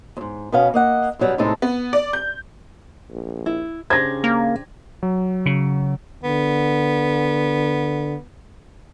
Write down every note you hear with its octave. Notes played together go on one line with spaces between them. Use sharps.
F2 G#2
B2 B3 C#4 F5
A#3 D#5 F#5
F#2 B2 F#3 G3
A2 C3 G#3 D#4 A4
B3
D5
G6
A#1
E4
C#3 D4 G4 C5 G#6 A#6
A#3
F#3
C#3
D3 B3